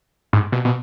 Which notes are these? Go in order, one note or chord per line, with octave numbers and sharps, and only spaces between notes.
G#2
B2
B2